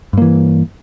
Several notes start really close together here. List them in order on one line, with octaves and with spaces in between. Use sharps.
G2 A#3 E3